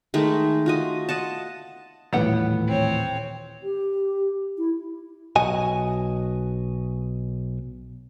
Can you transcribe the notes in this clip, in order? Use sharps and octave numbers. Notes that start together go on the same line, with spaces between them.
D#3 G#3 A3
F4 F#4 D#5
D#5 F#5 A5
D#1 A2 E3 B3 G4 F#5
C4 C#5
G4
E4
B1 F#4 D#5 G#5